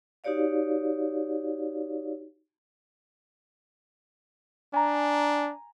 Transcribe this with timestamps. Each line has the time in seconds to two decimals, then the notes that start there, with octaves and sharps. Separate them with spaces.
0.24 D#4 F#4 G4 C#5 D5 F5
4.74 D4 G#5 A#5